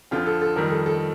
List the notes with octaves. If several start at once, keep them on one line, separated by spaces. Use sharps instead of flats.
F2 D3 F3 F4
A4
A4
F2 D#3 G3 A#4
A4
A4